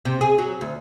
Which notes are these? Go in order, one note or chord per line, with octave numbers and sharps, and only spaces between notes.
C3
G#4
F#3
D2